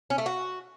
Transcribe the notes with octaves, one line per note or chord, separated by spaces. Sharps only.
C#4
A3
F#4